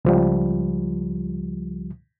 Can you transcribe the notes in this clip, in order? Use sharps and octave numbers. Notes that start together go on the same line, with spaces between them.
C#2 F3 G3